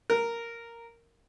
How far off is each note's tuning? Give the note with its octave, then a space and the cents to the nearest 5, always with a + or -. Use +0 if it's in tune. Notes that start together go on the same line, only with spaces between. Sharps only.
A#4 -5